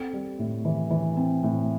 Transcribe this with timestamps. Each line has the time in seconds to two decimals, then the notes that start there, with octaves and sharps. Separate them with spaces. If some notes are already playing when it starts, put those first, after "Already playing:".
Already playing: C4 A4
0.13 G3
0.39 A2
0.65 E3
0.90 E3
1.17 C4
1.43 A2